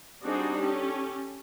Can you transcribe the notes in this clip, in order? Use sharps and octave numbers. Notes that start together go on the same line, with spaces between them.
G3 C4 D4 D#4 F#4 G#4
C#4 G4 A4